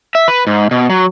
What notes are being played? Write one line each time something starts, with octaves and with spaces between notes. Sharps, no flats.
E5
B4
G#2
B2
F#3